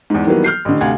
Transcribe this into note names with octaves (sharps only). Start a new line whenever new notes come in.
E2 G#2
D#3 E3 F#3 G3 A#3 B3
F6 G6 C7
A1 D3
D2 C3 F5 F#5 G#5 G#6